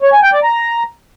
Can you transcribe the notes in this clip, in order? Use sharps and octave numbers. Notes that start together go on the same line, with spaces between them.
C#5
G#5
G5
D5
A#5